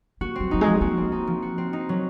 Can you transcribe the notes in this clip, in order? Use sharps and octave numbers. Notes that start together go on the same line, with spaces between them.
A#3 F#4
F#3 C4
F#3 D#4
G#3
F3
A#3 F#4
C4
D#4
F3
F#4
C4
D#4
F#3